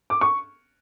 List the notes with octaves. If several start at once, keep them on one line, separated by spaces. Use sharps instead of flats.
D6
C#6